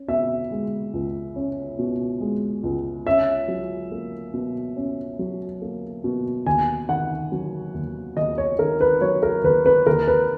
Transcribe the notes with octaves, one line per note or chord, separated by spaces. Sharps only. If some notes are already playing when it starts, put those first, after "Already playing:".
Already playing: C#4
B2 E5
G#3
C#2
C#4
B2
G#3
C#2
C#4 E5
F#3
A#3
B2
C#4
F#3
A#3
B2
D#2 G#5
D#3 F#5
F#3
D#2
D#2 D#5
C#5
D#3 A#4
B4
F#3 C#5
A#4
D#2 B4
B4
D#2 A#4
B4